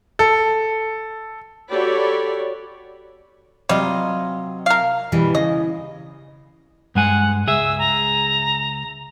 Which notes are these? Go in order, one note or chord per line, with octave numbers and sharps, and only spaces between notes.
A4
F#4 G4 A4 C#5 D5 B5
C3 F#3 G3 F4 D#5
A#4 F5
B2 E3 G3
C#3 D#5
G2 G#3 F#5 G#5
C#2 G#4 E5 E6
A#5